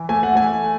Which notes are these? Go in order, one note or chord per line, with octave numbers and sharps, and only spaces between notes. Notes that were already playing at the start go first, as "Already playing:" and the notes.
Already playing: E3
A3 G#5
F#5
A3 G#5